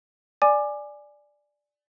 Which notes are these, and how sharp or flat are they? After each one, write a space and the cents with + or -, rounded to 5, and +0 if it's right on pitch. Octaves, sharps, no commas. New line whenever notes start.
D5 +0 G#5 +0 D6 +20